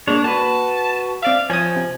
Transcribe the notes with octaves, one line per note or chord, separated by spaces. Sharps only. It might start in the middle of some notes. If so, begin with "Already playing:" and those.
G#3 A#3 D4 C#5
F#4 B4 A5
C4 D5 E5 F5
F3 C#5 G#5 D#6
C3